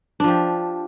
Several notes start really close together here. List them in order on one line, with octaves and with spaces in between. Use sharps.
D4 F3 G4